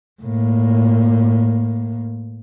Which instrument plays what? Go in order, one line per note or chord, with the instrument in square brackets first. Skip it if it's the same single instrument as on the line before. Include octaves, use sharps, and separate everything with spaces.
[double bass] A2 A#3